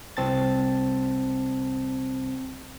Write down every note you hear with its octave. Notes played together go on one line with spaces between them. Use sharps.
C2 C4 A5 A6